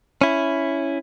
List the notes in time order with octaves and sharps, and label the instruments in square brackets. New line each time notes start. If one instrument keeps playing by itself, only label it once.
[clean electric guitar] C#4 E4